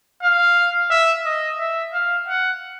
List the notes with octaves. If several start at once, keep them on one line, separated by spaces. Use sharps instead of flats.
F5
E5
D#5
E5
F5
F#5